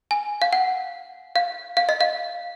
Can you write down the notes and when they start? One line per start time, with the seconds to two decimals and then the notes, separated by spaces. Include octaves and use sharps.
0.11 G#5
0.42 F5
0.53 F#5
1.36 F5
1.77 F5
1.89 D#5
2.01 F5